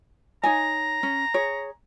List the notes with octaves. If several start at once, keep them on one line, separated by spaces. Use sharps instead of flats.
D#4 C#5 G#5 A#5
C#4
G#4 C#5